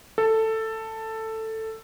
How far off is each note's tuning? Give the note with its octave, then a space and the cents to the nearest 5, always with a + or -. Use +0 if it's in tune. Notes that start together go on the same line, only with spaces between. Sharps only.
A4 +10